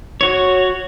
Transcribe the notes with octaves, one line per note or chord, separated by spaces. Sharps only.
F#4 C#5